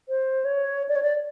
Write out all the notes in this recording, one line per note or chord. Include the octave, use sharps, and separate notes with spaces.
C5
C#5
D5
C#5
D5